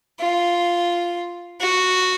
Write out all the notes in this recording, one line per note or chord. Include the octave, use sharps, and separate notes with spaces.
F4
F#4